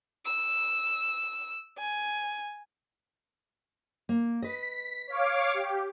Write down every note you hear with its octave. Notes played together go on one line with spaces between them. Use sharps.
E6
G#5
A#3
B4 D#5 B6
C#5 F5 D6
G4